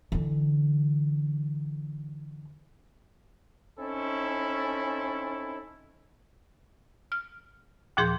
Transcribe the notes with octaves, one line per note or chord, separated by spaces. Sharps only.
D3 E3
C4 C#4 D#4 E4 A4
F6
D#2 A#2 F3 G#4 C6 G6